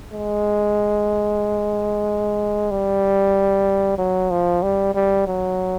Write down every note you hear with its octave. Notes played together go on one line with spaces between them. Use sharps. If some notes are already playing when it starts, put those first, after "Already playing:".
G#3
G3
F#3
F3
G3
G3
F#3